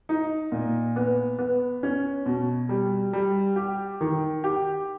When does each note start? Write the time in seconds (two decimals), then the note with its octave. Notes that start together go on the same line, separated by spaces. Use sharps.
0.09 D#4
0.52 A#2
0.96 B3
1.39 B3
1.83 C#4
2.26 B2
2.69 G3
3.13 G3
3.56 G4
4.01 D#3
4.44 G4